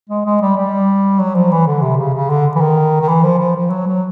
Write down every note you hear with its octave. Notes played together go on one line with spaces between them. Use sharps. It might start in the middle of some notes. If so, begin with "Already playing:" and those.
G#3
G#3
G3
G3
F#3
F3
E3
D3
C3
C#3
C#3
D3
E3
D#3
D#3
E3
F3
F3
F3
F#3
F#3